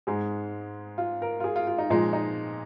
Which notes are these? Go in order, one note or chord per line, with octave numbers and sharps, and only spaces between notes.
G#2 G#3 G#4
F4
A#4
F4
G#4
F4
F4
D#4
A#2 F3 G#3 D#4
D#4